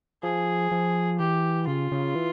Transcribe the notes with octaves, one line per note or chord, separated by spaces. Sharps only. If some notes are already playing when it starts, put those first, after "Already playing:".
F3 G#4
F3
E3 G4
C#3 F4
C#3
E3